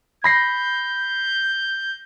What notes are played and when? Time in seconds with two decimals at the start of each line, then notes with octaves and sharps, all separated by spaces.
0.24 B5 G6 A#6 C7